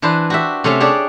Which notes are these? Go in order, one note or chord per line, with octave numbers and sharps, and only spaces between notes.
E3 D4 B4 C5
F#4 G4 E5
C3 A3 C#4 C#5 E5 A5
D4 G4 G#4 C#5 D5